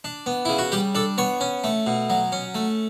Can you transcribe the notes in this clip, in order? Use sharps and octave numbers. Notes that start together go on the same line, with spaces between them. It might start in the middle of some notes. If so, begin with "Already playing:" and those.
D4
B3
C#3 E4
F#4
G3 G4
D4 A4
B3 C#5
C#4
A3
B2
F#3
C#4
A3